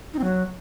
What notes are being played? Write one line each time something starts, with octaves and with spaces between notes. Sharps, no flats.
D#4
C4
F#3